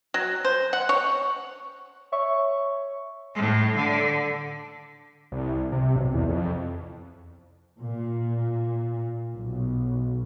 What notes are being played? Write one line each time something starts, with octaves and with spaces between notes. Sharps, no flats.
F#3
C5
F#5
C#5
C#5 E5 C#6
A2
D3
C2
C3
B1
E2
F2
A#2
B1